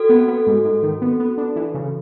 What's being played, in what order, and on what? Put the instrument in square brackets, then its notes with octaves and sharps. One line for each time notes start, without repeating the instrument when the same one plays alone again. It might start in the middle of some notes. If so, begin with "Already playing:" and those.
Already playing: [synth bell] F#4 A4
[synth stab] B3
B3
G#2
G#2
D#3
B3
B3
D4
E3
C#3